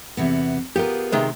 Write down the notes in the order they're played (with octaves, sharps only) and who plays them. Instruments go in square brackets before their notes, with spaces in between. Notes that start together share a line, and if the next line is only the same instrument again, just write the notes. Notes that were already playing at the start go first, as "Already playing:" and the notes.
[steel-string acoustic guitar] E2 C3 B3
[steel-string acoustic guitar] B3 F4 G#4 [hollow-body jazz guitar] G4 A#4
[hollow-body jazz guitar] C3 D#3 G#3